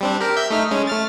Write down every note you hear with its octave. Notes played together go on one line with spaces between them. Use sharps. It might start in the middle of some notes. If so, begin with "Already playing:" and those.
G3 C4 D4
G4 A#4
E5 E6 G6
A3 D#4 F6
G#3 C#4
A3 F6 A6